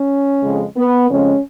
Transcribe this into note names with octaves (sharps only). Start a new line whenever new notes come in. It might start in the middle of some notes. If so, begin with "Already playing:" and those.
Already playing: C#4
F2 C#3 G#3
B3
F2 C#3 G#3 C#4